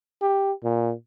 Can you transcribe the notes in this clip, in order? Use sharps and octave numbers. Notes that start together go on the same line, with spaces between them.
G4
A#2